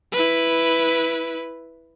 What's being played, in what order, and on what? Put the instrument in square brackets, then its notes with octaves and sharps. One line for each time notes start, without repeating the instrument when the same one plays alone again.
[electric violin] E4 B4